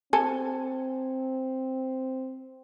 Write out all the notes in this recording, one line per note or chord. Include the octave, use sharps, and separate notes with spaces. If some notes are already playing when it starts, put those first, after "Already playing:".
C4 A4 G#5